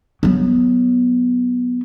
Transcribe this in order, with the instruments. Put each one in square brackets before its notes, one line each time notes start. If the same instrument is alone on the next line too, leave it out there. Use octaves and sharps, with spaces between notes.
[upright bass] F#3 B3